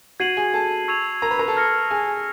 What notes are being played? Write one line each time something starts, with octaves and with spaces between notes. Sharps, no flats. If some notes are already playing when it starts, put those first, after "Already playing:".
F#4 F#5 G#6 C7 D#7 F#7
G#4 G#5
A4 A5
C#6 E6 G#6 C7 F7
A#4 A#5
B4 B5
A#4 A#5
A4 A5
F6 A#6 C#7
G#4 G#5